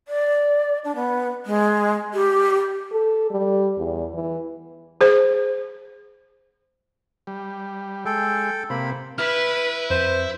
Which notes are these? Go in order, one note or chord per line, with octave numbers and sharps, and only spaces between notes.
D5
D4
B3
G#3
G4
A4
G3
E2
E3
G#4 C5
G3
G#3 A4 G5
C3 A#3 B5
E4 B4 F6
F2 C5